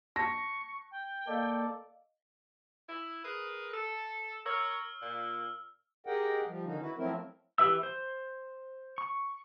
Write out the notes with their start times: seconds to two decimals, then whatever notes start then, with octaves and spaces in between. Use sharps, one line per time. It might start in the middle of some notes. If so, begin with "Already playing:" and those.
0.16 A5 C#6 A#6
0.91 G5
1.27 A#3 A4 D5 D#5 F5
2.89 E4
3.25 G#4 A#4 B4
3.74 A4
4.46 A#4 C#5 E6 F6
5.01 A#2
6.07 G4 G#4 A#4 D#5 F#5 G5
6.47 F3 G3
6.65 D3 D#3 C#4 D#4 F#4
6.81 E4 F#4 B4
6.97 F3 F#3 A3 C4 E4 A#4
7.58 E3 G4 B4 E5 E6
7.83 C5
8.98 C#6